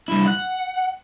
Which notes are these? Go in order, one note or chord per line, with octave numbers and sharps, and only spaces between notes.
G2 E4
F#5